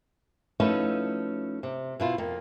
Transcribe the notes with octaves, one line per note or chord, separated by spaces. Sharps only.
F3 A3 C#4 D#4 E4 B4
C3
B2 E4 F4
F2 A#3